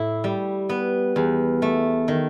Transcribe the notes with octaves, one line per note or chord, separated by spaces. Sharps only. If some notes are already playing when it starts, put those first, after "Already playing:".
Already playing: A2 E4
G3
B3
E2
A3
D#3